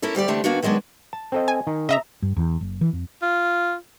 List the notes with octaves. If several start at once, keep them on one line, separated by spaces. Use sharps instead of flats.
A#3 C#4 E4 A4
D2 G3 G4 D5
D3 E3 G3 A3 C4 D4
D#3 A#3 B3 D4 F#4
D#3 F#3 G#3 B3 D4
A5
C4 A4 D#5
G#5
D#3
C#3 D#5 E5 A#5
G2
E2
F#1
E3
F2
F4